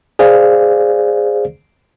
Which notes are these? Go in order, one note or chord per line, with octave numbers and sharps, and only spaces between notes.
G#4 C5 D5 F5